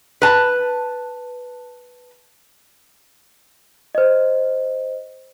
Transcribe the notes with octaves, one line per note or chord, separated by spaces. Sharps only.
B4 A5
C5 D#5